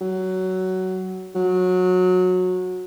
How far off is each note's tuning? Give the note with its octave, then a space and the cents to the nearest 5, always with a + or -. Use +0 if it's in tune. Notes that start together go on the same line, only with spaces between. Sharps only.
F#3 +15
F#3 -20